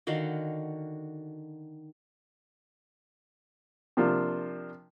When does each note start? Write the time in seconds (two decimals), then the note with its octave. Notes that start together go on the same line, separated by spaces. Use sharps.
0.07 D3 D#3 F#4 F5
3.97 C3 F3 A#3 D4 F4